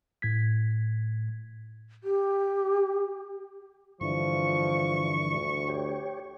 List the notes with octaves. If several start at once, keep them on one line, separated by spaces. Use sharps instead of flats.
A2 G#6 B6
G4
G2 D3 E3 F3 C#6
D2
G4 C#5